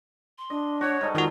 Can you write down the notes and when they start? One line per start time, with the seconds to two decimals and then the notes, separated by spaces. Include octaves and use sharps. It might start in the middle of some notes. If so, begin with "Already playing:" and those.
0.38 C6
0.50 D4 D#5
0.81 F#4 C#5 F#5 C#6
1.01 G#2 G3 D#4 A4
1.15 D#3 F4 F#4